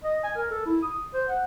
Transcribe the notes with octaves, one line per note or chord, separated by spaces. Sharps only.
D#5
G#5
A#4
A4
E4
D#6
C5
F#5